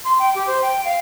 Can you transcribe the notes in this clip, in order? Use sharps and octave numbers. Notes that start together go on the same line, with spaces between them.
C6
G5
G4
C5
G5
F5